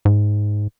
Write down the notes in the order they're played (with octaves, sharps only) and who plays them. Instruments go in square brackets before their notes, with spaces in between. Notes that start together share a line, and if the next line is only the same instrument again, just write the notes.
[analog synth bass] G#2